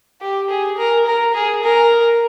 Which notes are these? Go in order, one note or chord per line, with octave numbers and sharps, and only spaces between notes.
G4
G#4
A#4
A#4
G#4
A#4